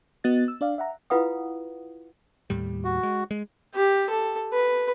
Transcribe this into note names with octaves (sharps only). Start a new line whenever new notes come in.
B3 F#4 D#5 F#6 A6
E6
D4 D5 F5
E5 F#5 A#5
E4 F4 B4 F5 F#5 D#6
D#2 A2 G3
F#4
G#3
G#3
G4
A4
B4